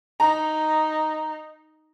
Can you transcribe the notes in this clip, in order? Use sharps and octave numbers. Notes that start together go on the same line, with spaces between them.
D#4 A#5